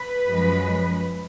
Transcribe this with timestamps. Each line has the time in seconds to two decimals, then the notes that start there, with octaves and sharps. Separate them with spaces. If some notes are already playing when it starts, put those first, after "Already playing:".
Already playing: B4
0.26 F#2 F3 G#3